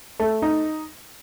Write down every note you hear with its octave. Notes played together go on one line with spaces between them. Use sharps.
A3
D#4